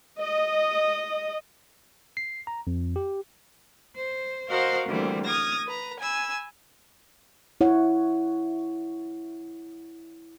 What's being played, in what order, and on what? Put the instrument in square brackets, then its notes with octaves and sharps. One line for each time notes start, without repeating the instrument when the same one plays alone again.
[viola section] D#5
[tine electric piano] C7
A#5
F2
G4
[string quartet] C5
F#4 A#4 C5 D#5 F5 F#5
D2 E3 G3 A#3 C4
D#6 F6 G#6 A#6
B4 A#5
G#5 B5 E6
[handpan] E4 C#5 F#5